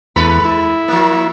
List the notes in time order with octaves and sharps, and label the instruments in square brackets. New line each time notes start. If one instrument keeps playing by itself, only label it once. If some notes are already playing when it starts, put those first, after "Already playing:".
[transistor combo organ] E2 [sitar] G#3 A4 B4 [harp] B5
[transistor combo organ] E4
[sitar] F3 A#3